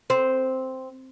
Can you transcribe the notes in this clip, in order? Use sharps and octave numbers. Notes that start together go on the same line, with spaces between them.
C4